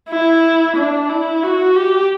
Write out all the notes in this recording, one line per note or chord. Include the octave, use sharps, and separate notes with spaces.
E4
D4
E4
F#4
G4